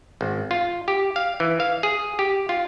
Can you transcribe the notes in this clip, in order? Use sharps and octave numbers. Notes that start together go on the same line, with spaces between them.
G#1
F4
G4
F5
E3
F5
G#4
G4
F4